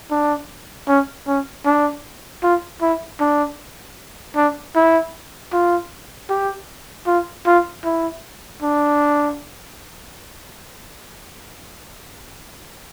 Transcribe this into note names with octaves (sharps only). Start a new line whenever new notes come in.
D4
C#4
C#4
D4
F4
E4
D4
D4
E4
F4
G4
F4
F4
E4
D4